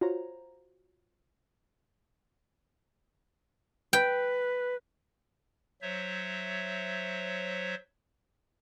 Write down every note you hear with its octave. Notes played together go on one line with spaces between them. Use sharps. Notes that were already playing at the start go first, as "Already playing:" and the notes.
F4 F#4 C5 C#5 A#5
B4 G5
F#3 C5 C#5 E5